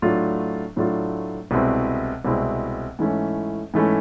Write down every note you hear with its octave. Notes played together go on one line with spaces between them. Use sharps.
A2 F#3 A3 D4 F4
A2 F#3 A3 D4 F4
C2 B2 G#3 C4 E4
C2 B2 G#3 C4 E4
G#2 E3 A3 C#4 E4
G#2 E3 A3 C#4 E4